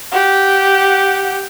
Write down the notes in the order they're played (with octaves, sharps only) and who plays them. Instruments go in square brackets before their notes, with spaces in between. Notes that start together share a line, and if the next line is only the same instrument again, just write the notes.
[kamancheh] G4 F#5